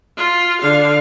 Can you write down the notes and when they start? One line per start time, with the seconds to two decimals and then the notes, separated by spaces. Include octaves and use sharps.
0.17 F4
0.62 D3 F5